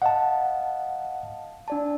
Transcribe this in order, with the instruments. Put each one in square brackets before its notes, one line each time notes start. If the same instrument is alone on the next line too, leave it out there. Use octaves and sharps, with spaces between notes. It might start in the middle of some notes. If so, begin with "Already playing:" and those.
[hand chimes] D#5 F5 [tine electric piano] F#5 A5
[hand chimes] D4 D5 A5